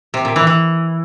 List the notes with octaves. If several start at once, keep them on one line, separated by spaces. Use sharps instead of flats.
C3
A#2
E3
E3